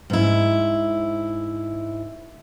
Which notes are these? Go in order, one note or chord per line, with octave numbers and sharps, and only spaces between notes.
G#2 E4